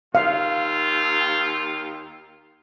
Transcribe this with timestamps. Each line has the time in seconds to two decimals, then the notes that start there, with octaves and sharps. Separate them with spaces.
0.15 D#2 F4 F5